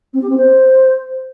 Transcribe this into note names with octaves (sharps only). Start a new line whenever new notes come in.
C4
G4
C4
C5